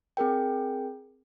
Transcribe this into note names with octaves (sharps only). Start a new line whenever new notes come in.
C4 G#4 A#4 G5